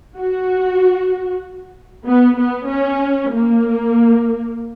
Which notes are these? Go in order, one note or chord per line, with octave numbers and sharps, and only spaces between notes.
F#4
B3
B3
C#4
A#3